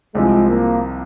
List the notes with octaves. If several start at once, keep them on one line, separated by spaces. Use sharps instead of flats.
C2 C3 F3 G#3
A#3